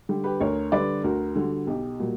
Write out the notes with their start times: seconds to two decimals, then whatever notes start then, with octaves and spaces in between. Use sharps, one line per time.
0.09 D3 G3 G4
0.24 G4 B4
0.40 D2 A#4 C#5
0.72 D3 G3 B4 D5
1.04 D2 F#4 A#4
1.35 D3 G3 F#4
1.67 B1 G4
1.99 A#2 G3 F#4